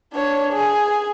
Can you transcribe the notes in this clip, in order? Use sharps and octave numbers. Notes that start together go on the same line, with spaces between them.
D4 C#5
G#4